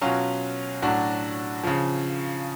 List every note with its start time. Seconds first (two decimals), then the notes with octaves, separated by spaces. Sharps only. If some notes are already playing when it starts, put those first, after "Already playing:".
0.01 B2 F#3 C#4 F4
0.82 A2 F#3 D4 F#4
1.64 C#3 F3